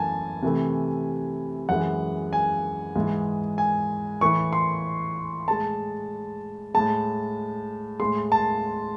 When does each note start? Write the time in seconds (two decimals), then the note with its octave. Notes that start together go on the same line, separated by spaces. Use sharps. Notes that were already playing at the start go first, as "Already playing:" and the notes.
Already playing: F#2 E3 A3 G#5 A5
0.42 C3 E3 A3
1.69 F#2 E3 G#3 F#5
2.33 G#5
2.96 G#2 E3 G#3
3.58 G#5
4.21 A2 E3 A3 C#6
4.53 C6
5.48 A2 G#3 A5
6.74 A2 G#3 A5
8.00 A2 G#3 C6
8.32 A5